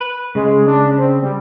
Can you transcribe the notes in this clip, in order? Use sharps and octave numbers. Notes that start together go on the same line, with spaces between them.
B4
C#3 G#3
D4
C4
G3